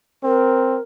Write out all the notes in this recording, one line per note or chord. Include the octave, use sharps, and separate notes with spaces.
C4 A#4